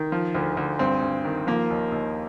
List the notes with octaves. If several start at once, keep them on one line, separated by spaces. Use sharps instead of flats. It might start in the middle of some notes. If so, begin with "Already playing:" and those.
Already playing: D#3
F3
D2
D2
G2 C4
G2
D#3
F3 A#3
D#2
D#2